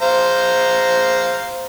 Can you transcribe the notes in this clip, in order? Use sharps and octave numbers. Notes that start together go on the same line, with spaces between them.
C5 F5 A#5